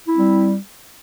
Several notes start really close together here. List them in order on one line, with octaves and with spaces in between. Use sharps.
E4 C4 G3